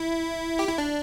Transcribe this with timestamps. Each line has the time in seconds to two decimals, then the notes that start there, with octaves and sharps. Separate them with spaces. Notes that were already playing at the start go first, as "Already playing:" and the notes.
Already playing: E4
0.59 G4
0.68 E4
0.78 D4